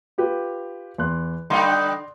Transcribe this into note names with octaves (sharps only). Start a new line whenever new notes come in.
F4 G4 B4
E2 C6 F#6
D3 G3 D#4 D5 F5 C6